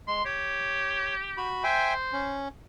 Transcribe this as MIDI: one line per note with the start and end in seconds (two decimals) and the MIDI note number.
0.08 0.23 56
0.08 0.24 84
0.25 1.52 67
0.25 1.15 73
1.37 1.63 66
1.37 1.63 83
1.64 2.37 72
1.64 1.94 76
1.64 1.94 79
1.64 1.94 80
2.13 2.48 61